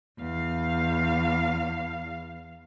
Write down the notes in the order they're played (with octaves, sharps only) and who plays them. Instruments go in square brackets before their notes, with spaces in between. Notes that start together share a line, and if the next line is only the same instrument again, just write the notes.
[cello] E2 F5